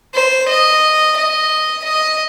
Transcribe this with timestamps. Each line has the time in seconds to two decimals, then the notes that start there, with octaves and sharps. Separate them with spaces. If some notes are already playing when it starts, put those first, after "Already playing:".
0.14 C5
0.48 D#5
1.17 D#5
1.84 D#5